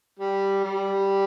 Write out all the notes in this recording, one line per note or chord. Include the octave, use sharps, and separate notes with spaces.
G3
G3